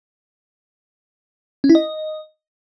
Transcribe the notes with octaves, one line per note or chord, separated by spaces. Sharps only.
C#4
E4
D#5